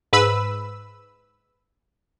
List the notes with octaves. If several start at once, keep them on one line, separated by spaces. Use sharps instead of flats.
G#2 B4 B5 E6